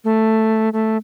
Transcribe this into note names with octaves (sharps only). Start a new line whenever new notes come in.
A3
A3